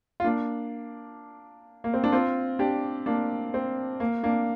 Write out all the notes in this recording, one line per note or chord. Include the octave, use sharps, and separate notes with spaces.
F4
A#3 D4
A#3
C4
D4
C4 F4
D4 G4
A#3 D4
C4
A#3
A#3 D4